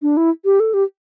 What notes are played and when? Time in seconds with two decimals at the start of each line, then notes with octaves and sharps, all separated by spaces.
0.02 D4
0.17 E4
0.45 G4
0.60 A4
0.74 G4